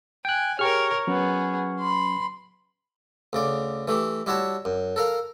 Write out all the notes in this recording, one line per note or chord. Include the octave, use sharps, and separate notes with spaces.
G5 G#5 F#6
G4 G#4 A#4 C#5 G5 C#6 F6
F#3 B3 C#4 G#4
B5 C6
D2 C#3 D5
E3 A3 G4
G3 E4 F#4 C#5 A5
F#2
A4 A#4 F5